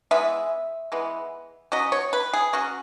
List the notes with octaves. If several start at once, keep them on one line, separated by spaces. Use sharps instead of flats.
E3 G#3 B3 E5
E3 G#3 B3
F#3 C#4 D#5
C#5
B4
G#4
F#3 C#4 F#4